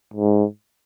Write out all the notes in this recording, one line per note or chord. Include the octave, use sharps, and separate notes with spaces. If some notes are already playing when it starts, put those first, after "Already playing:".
G#2